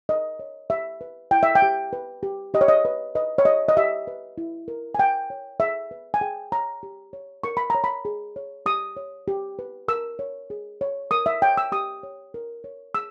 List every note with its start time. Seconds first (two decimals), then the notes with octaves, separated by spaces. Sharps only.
0.09 A#4 D#5
0.39 C#5
0.70 G4 E5
1.01 B4
1.31 E4 G5
1.43 E5
1.55 G5
1.62 G4
1.93 B4
2.23 G4
2.54 G4 D#5
2.61 C#5
2.68 D#5
2.85 B4
3.15 B4 D#5
3.38 C#5
3.45 G4 D#5
3.69 D#5
3.77 G4 E5
4.07 B4
4.38 E4
4.68 A#4
4.95 G#5
4.99 A#4 G5
5.30 C#5
5.60 G#4 E5
5.91 B4
6.14 G#5
6.21 G#4 G5
6.52 C#5 A#5
6.83 G4
7.13 C#5
7.43 A#4 C#6
7.57 B5
7.70 C#5 A#5
7.84 B5
8.05 G#4
8.36 C#5
8.66 G4 D#6
8.97 C#5
9.28 G4
9.59 B4
9.88 A#4 E6
10.19 C#5
10.50 G#4
10.81 C#5
11.11 A#4 D#6
11.26 E5
11.42 C#5 G5
11.57 E6
11.72 G4 D#6
12.03 C#5
12.34 A#4
12.64 C#5
12.95 G#4 E6